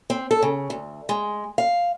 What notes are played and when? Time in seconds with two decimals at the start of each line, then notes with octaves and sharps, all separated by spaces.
0.10 C4
0.31 A4
0.43 C#3
0.70 D2
1.09 G#3
1.58 F5